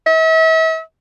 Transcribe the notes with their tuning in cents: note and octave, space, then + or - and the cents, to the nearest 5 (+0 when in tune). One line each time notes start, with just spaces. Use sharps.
E5 -40